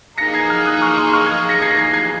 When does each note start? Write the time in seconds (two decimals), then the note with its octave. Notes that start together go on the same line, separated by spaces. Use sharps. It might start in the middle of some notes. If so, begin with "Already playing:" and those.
0.18 A#3 D#4 G#4 A#6 C#7
0.34 G#6 C7
0.50 F6 G#6
0.65 D#6 F#6
0.82 C#6 F6
0.98 C6 D#6
1.13 C#6 F6
1.26 F6 G#6
1.49 A#6 C#7
1.62 G#6 C7
1.71 A#6
1.77 G#6 C7
1.93 G#6 C7